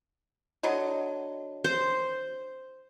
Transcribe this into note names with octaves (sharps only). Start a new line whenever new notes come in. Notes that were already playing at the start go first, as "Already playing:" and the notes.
D3 F#3 D#5
C5